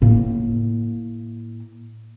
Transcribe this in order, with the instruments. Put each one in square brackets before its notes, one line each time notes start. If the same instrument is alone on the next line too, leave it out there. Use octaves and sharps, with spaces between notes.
[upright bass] A2 A#3